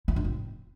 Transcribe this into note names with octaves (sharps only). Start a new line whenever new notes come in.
E4
D4
C4